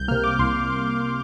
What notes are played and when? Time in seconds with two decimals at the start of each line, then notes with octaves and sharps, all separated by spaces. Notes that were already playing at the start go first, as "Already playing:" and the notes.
Already playing: C2 G6
0.08 A#3 F6
0.11 C3
0.24 D6
0.39 C2 C6